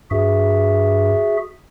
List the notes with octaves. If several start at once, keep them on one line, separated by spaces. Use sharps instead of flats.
G2 F#4 G#4 E5